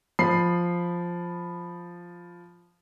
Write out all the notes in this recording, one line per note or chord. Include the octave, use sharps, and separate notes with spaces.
F3 B5 C7